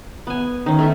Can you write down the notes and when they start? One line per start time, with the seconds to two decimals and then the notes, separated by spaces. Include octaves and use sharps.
0.27 B3 G#5
0.66 D#3 C#4
0.79 A3 A4 E5